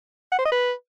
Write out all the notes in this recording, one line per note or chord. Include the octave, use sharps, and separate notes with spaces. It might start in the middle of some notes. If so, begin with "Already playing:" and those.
F#5
C5
D#5
B4